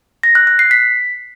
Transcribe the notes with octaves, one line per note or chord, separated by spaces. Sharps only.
A#6
F#6
F#6
C7
B6